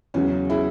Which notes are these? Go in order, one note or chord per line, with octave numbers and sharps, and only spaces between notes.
E2 C#3 F#3 C#4
E4 G#4